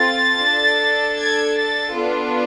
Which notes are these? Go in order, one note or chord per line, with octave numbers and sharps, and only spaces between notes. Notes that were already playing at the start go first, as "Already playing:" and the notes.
Already playing: C4 F4 A4 A6
D4 A4
G#6
A6
B3 D4 F4 A4